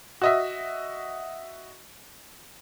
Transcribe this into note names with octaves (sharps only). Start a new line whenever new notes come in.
F#4 D#5 E5